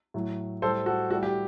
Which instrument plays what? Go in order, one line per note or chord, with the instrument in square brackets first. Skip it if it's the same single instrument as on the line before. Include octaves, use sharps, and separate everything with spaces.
[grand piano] A2 F#3
A2 G3 A4 C5
F#4 A4
A2 G3 F#4 A4
G4